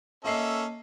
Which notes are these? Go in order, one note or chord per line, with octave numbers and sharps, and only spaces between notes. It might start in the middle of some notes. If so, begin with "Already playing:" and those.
A#3 C#4 A4 D#5 E5 C7